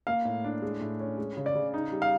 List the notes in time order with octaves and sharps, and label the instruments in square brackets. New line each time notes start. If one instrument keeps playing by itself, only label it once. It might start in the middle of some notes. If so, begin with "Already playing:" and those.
[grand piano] A#3 [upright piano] F5
[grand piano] A2
D4
G#3
A2
C#4
G#3
C#3
[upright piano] D5
[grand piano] C#3
D#4
G3
[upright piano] F5